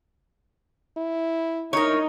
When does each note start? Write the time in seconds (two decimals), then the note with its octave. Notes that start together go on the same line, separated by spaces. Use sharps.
0.97 E4
1.73 D#4 A#4 C#5